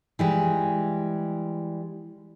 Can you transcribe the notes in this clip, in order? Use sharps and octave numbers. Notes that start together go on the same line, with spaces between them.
E3 G3 G#3